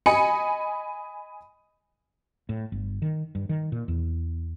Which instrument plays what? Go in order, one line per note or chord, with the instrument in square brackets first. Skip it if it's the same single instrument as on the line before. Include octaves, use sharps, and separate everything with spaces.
[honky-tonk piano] D#5 G#5 B5 C#7
[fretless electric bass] A2
G1
D#3
G2
D#3
A#2
E2